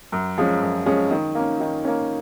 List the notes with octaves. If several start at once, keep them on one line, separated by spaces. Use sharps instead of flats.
F#2
F3 G#3 C#4
F#2
F3 G#3 C#4
D#3
A#3 C#4
D#3
A#3 C#4